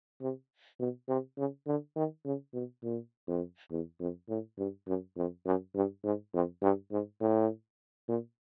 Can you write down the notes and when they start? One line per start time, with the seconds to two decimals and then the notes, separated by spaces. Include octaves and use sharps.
0.21 C3
0.79 B2
1.08 C3
1.38 C#3
1.67 D3
1.96 D#3
2.25 C#3
2.54 B2
2.83 A#2
3.27 F2
3.71 E2
4.00 F2
4.29 A2
4.58 G2
4.87 F#2
5.17 F2
5.46 F#2
5.75 G2
6.04 G#2
6.34 F2
6.62 G2
6.91 G#2
7.20 A2
8.08 A#2